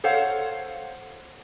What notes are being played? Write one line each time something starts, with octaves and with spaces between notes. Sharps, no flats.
A4 C5 C#5 F5 F#5